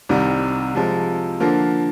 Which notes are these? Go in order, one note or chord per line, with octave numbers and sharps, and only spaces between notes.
C2 C3 D#3 G3
C3 F3 G#3
D3 F3 A#3 F4